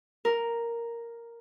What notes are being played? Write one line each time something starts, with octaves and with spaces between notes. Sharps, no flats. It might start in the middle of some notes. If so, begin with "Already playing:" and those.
A#4